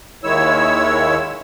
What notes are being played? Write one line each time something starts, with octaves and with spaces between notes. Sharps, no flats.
D#2 D#3 G#3 E4 C#5 E6